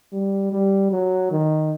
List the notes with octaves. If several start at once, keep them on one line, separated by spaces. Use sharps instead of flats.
G3
G3
F#3
D#3